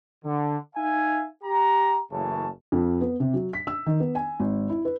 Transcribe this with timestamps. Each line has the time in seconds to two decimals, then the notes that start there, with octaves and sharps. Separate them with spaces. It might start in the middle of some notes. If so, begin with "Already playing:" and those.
0.25 D3
0.76 D#4 E5 F5 G#5
1.43 G4 A#5
2.12 F#1 C#3 E3 A3 A5
2.72 F2
3.01 B3
3.20 C3
3.34 F#3
3.53 B6
3.67 E6
3.86 D#3
4.00 B3
4.15 G#5
4.40 G#1
4.70 E4
4.85 B4